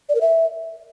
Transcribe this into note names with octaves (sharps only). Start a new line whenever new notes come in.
D5
A#4
E5